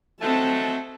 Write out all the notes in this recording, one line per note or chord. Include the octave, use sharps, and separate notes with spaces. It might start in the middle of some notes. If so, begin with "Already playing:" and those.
F#3 G#3 A3 C4 A5